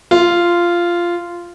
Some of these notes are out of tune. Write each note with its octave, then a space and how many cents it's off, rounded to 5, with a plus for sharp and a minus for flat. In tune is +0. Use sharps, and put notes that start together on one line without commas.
F4 -10